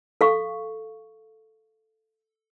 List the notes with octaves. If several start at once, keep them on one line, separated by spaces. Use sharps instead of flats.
A4 F5 C#6